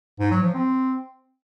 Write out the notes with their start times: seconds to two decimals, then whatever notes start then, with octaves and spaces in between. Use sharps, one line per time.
0.19 G#2
0.31 F#3
0.43 F3
0.54 C4